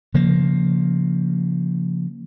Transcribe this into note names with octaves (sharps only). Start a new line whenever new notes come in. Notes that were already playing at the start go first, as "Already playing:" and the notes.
C#3 F3 A#3